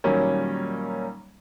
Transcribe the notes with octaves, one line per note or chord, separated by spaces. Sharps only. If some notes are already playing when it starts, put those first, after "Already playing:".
A#2 D#3 F#3 G3 A#3 C#4